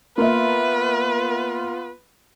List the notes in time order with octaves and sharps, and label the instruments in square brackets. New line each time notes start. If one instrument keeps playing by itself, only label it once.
[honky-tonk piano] A#3 E5 [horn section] B3 F4 [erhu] B4